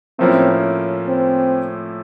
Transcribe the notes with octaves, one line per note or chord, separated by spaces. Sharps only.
A2 F3 A#3 C4 C#4 E4
C4